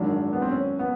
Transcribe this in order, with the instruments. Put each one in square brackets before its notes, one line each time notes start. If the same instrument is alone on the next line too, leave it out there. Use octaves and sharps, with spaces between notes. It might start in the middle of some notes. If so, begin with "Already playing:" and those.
Already playing: [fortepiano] G#1 F#2 D#3 [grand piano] D4
[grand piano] B3
C4
C#4
B3